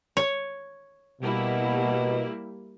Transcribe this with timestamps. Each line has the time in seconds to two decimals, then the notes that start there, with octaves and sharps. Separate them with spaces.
0.17 C#5
1.22 B2 G3 A#3 E4